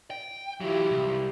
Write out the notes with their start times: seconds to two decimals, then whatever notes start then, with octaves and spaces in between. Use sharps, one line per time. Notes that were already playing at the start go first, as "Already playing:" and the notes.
0.10 G5
0.61 E3 F#3 E4 F4 G4
0.91 C2